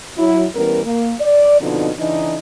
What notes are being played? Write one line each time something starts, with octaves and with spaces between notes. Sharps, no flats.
F#3 E4
E3 G3 B3 C#4 A#4
A#3
D5
B2 D3 F3 C4 D#4
C#3 E3 D4 D#4